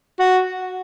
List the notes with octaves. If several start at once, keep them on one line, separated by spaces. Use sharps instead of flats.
F#4